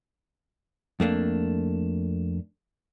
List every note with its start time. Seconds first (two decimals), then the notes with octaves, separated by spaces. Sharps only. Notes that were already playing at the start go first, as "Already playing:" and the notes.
1.00 F2 A3 A#3 D4